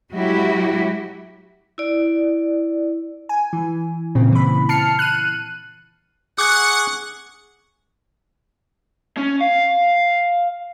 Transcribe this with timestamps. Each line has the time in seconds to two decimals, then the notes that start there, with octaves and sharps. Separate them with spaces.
0.12 F#3 G#3 E4 F#4 G4
1.78 E4 D5
3.29 G#5
3.53 E3
4.15 A#2 C#3 C4
4.32 E3 B5
4.69 A5 F6 C7 C#7
4.99 F#6 D#7
6.38 G#4 F#5 C#6 D6 F#6
9.17 C#4
9.41 F5